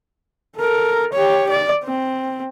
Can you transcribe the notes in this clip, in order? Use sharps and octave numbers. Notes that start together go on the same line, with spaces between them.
A4 A#4
G4 C#5
D5
C4